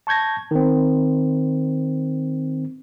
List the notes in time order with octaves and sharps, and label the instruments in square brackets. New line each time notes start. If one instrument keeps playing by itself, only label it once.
[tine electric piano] A5 C#6 G6 G#6 A#6
D#3 C4